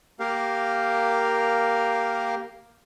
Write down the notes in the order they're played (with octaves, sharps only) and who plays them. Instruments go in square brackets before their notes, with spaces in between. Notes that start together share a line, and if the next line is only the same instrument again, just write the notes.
[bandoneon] A#3 G4 A#4 F5